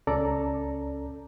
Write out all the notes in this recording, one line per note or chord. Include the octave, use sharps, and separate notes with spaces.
C#2 C#4 A4 D5 A#5